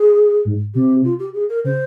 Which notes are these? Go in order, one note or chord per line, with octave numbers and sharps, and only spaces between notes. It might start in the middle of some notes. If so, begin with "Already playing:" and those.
Already playing: G#4
G#2
C3 G4
F4
G4
G#4
A#4
C#3 C5